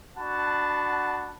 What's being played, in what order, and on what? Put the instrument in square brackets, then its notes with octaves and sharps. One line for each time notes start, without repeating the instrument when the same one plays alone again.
[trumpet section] D4 F#4 F#5 A5 B5